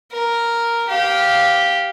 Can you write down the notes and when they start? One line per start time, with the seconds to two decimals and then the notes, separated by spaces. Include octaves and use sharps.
0.12 A#4
0.89 G4 F5